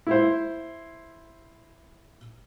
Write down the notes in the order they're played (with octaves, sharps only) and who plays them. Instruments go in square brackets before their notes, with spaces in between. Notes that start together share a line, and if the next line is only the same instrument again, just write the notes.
[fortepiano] E4 C5